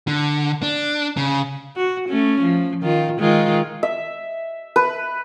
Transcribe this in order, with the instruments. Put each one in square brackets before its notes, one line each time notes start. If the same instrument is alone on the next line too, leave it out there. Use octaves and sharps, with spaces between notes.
[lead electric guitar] D3
D4
C#3
[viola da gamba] F#4
A3 C#4
F3
D#3 F4
D#3 G#3 F4
[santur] E5
B4